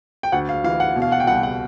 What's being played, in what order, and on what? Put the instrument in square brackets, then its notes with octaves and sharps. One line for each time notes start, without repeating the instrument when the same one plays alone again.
[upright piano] G5
D2 F#5
F5
E3 F5
F#5
B2
F5
F#5
G5
C2 F#5
F#5